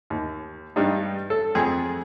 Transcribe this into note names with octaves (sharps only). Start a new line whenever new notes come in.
D#2
G2 G3 D#4
A4
F2 G#4